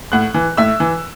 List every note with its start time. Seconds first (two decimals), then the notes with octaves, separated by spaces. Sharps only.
0.12 A2 F#5 F#6
0.34 E3
0.57 A2 E5 E6
0.80 E3